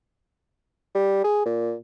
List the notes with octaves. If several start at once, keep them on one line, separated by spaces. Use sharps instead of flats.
G3
G#4
A#2